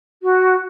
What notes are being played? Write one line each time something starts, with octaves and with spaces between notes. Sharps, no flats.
F#4